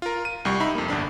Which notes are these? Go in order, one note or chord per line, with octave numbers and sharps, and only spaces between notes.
F4 A#4
D#7
C2 G3 C#6
D#4 E5 B5
F2 A#3
G1 C2 D4 B5